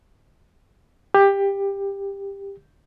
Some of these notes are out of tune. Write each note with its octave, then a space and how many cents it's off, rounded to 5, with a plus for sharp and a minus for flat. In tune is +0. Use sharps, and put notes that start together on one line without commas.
G4 +15